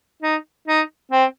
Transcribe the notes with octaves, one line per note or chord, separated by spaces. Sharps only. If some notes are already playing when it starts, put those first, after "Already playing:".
D#4
D#4
C4